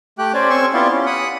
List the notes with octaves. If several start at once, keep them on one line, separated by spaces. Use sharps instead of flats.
A3 G4 G5 F#6
C#4 C5 D5 G#5
C4 C#4 G#5 C6 C#6 E6
B3 E4 F4 G4 D5 F5
C#4
F#5 B5 D#6 F#6